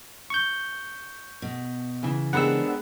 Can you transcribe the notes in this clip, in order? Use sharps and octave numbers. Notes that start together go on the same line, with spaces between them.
C#6 G6
B2
C#3 E3
G#3 B3 C4 D4 G4 A#4 F#5 E6